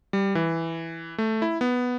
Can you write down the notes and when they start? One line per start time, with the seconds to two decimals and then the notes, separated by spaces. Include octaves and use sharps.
0.13 G3
0.35 E3
1.18 A3
1.42 E4
1.61 B3